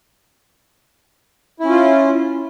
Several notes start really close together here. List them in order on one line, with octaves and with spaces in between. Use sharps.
E4 C#4 F4